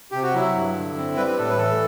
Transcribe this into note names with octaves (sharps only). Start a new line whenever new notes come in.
C3 G4
F#4
F#3 E4
G2
D3
C4
G3 B4
B4
A2 A4
B4
E3 A4